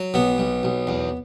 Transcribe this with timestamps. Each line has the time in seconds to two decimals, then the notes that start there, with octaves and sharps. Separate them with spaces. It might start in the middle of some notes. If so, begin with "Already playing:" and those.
Already playing: F#3
0.14 B1 B3
0.38 B1
0.63 B1
0.87 E2